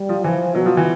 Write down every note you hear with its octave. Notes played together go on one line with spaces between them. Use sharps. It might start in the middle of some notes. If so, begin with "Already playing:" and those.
Already playing: G3
F3
E3 F3
B2 F#3
F3
E3